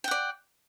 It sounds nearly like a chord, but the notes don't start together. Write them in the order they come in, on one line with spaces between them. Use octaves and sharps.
G5 F#5 D5